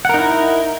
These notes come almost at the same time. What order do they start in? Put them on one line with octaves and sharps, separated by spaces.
F#5 A#4 D#4 E4